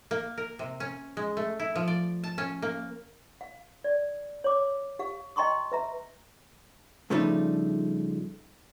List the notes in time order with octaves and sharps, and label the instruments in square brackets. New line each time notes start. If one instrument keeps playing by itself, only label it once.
[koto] A#3
A#4
C3
C#4
G#3
A3
E4
F3
D5
A5
C#4
A#3
[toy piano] F5
D5
C#5 D6
G4 F5
D#5 G5 A#5 C6 C#6 D#6
B4 E5 A#5
[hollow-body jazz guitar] G2 C#3 F3 G3 A3 D#4